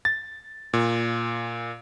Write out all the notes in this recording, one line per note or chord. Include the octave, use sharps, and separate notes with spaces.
A6
A#2